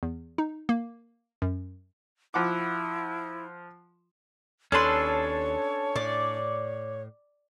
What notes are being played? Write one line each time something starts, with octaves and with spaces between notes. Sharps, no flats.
E2
D#4
A#3
F#2
F3 E4 F#5 D6
D#2 C#4 D4 A4 B4 C#5 C6
A2 D5